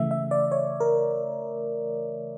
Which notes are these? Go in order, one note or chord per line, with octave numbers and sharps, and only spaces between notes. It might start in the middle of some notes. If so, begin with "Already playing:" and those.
Already playing: C#3 E3 A3 E5
E5
D5
C#5
A#4